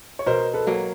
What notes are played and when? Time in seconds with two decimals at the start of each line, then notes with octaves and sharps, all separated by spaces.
0.19 C#5
0.26 B2 A#4 C5
0.54 A4 B4
0.67 F#3 A#3